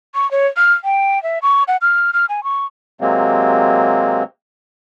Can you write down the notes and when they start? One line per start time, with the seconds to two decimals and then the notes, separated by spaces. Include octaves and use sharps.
0.15 C#6
0.31 C#5
0.57 F6
0.84 G5
1.23 E5
1.42 C#6
1.68 F#5
1.82 F6
2.13 F6
2.29 G#5
2.44 C#6
3.01 C3 F#3 G#3 A#3 C4